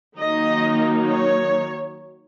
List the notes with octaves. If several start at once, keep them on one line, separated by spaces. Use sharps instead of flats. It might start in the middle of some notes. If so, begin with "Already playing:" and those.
D#3 F#3 A#3 D#4 D#5
C#5